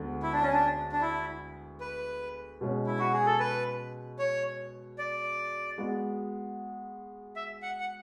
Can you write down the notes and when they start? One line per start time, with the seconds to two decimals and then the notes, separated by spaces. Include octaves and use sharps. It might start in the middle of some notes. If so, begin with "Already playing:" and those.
Already playing: D2 D3 G#3 B3
0.23 E4
0.33 D4
0.42 C#4
0.53 D4
0.92 D4
1.01 E4
1.81 B4
2.61 B2 G#3 C#4
2.87 E4
2.99 F#4
3.13 G#4
3.26 A4
3.40 B4
4.19 C#5
4.98 D5
5.78 G#3 B3 F#4
7.36 E5
7.63 F#5
7.80 F#5